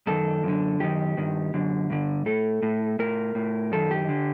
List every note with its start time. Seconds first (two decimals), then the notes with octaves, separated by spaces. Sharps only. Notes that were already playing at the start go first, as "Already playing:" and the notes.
0.07 F#2 D#3 A4
0.43 F#2 D3
0.80 F#2 D#3 G4
1.17 G2 D#3
1.54 F#2 D3
1.90 G2 D3
2.26 A2 A4
2.63 A2
2.99 A2 A#4
3.35 A2
3.72 F#2 D#3 A4
3.91 G4
4.08 D3